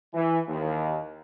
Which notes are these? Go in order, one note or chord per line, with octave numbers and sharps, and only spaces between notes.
E3
D#2